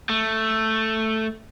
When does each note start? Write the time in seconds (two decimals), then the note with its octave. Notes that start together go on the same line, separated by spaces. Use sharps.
0.09 A3